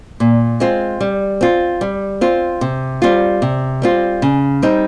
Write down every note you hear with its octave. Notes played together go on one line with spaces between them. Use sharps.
A#2
G#3 C4 F4
G3
C4 F4
G3
C4 F4
C3
G3 C4 F4
C3
G3 C4 F4
C#3
G3 C4 D#4